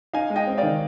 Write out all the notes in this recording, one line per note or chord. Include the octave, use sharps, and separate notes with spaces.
D#4 F5 G#5
G#3
D#5 G5
C4
D5 F5
D#3